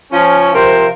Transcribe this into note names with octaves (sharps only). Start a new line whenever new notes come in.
F3 C#4
C3 F3 F4 A#4 C5